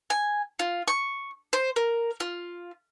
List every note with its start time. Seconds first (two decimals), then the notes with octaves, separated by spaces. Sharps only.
0.10 G#5
0.59 F4
0.88 C#6
1.53 C5
1.76 A#4
2.20 F4